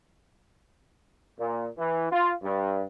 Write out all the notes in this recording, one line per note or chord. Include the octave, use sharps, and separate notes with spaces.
A#2
E3
F4
G2